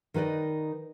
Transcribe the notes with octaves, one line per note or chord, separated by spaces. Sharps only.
D#3 D#4 B4 D5 D#5